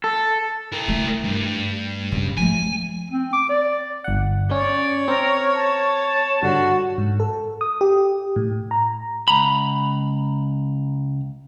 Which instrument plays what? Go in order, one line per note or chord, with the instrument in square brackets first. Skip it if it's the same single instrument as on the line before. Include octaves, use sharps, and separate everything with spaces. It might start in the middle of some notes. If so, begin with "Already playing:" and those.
[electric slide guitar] A4
[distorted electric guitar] E4 A#4
[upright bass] A3
[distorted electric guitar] G2
[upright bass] F#2 C#3
[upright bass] F3 A3 [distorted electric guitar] G#5
[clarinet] C4
D6
D5
[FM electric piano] G1 F#5
[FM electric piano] C#4 [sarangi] C#5 [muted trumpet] D5
[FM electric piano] C4 [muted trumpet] A#4
[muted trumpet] A5
[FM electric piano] G2 D3 [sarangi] F#4
[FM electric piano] G#2
A4
D#6
G4
A2
A#5
[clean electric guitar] C#2 A#5 B5